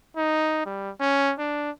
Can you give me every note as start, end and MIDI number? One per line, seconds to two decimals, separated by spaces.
0.17 0.62 63
0.66 0.91 55
1.01 1.34 61
1.39 1.71 62